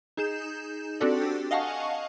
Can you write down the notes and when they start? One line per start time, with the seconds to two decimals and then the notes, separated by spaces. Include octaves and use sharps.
0.17 D#4 G#4 G6 E7
1.00 C4 D4 F#4 G4 A4 D5
1.51 D#5 F5 F#5 G#5 A5 C#6